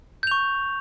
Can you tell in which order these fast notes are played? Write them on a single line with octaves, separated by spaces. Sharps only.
G6 F7 C#6